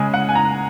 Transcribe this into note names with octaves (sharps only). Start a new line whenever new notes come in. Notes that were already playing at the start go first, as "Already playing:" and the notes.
Already playing: C#3 G#3 G#5
F#5
G#5
A#5